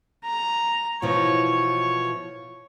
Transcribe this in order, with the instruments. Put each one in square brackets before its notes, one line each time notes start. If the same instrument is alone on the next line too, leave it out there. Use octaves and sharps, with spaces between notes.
[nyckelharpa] A#5
[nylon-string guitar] B2 E3 F3 [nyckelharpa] C#5